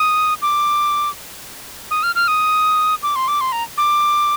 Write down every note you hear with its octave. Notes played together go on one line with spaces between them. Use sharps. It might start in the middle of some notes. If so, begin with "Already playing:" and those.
Already playing: D#6
D6
D#6
F6
F6
D#6
D6
C6
D6
C6
A#5
D6